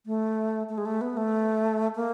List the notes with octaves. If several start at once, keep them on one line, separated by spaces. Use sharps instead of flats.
A3
A3
G#3
A3
B3
A3
A#3